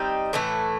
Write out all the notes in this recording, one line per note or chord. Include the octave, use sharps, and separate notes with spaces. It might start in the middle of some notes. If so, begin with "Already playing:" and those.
Already playing: G3 C4 D#4
A2 E3 A3 E4